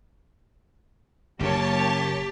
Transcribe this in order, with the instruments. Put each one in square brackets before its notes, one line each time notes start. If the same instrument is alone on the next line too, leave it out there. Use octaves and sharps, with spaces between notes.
[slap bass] F#1 F#2 A#2 [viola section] A#3 C#5 [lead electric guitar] G4 [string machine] A5